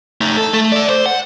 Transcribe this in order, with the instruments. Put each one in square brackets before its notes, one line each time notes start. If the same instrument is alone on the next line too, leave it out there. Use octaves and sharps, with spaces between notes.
[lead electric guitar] A3 D#4
A4
A3
A4 D5
C5
F#5